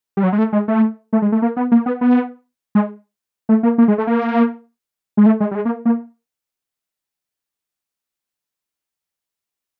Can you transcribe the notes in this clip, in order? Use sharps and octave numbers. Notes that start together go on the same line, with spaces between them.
G3
F#3
G#3
A3
G#3
A3
A3
G#3
A3
A#3
B3
A#3
B3
B3
G#3
A3
A#3
A#3
G#3
A3
A#3
G#3
A3
G#3
G3
G#3
A#3
A#3